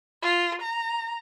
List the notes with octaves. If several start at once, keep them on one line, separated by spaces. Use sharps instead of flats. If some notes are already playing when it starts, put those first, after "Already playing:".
F4
A#5